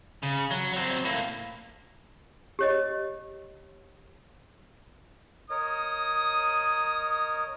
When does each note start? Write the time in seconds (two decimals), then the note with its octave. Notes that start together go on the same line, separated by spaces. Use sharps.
0.23 C#3
0.51 F#3
0.73 F#3 C4
1.04 A2 A#3
2.59 G4 C#5 D#5
5.50 A#4 C#5 D#5 D#6